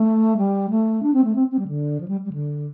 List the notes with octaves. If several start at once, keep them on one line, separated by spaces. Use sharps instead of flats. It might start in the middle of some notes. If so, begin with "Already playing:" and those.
Already playing: A3
G3
A3
D4
C4
A3
C4
C4
G3
D3
F3
G3
G3
D3